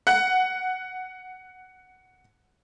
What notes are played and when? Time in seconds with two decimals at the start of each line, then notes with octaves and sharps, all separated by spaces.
0.07 F#5 F#6